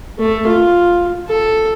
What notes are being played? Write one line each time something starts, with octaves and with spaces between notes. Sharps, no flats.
A3
F4
A4